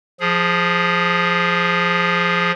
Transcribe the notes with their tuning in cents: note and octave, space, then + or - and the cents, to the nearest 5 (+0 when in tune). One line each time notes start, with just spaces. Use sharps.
F3 +0 G#4 +0